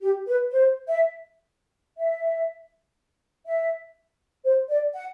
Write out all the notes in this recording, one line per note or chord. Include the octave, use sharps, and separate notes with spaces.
G4
B4
C5
E5
E5
E5
C5
D5
F#5